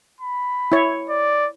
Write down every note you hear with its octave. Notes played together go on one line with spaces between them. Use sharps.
B5
E4 C#5
D5